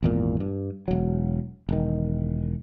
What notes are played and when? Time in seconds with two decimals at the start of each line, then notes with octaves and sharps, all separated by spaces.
0.03 G#1 E2 A#2
0.40 G2
0.88 E1 F#3
1.69 E1 D#3